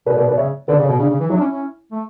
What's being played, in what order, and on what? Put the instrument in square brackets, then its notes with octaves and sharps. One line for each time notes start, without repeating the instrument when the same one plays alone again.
[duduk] B2 [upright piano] B4 D5
[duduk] B2 [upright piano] B4 D5
[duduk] B2 [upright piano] B4 D5
[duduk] C#3 [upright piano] C#5 E5
[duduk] D3 [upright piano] B4 D5
[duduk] C#3
[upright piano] A4 C#5
[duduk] B2
[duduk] C#3 [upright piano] D4
[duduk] C#3
E3
[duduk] F#3 [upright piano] E4
[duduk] D4
C#4
C#4
A3